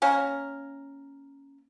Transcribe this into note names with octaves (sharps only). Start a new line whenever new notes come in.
A#3 C#4 A#4